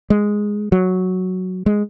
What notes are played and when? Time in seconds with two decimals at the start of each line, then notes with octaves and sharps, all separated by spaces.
0.10 G#3
0.72 F#3
1.66 G#3